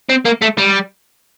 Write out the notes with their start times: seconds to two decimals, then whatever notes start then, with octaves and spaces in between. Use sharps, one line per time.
0.10 C4
0.26 A#3
0.42 A3
0.58 G3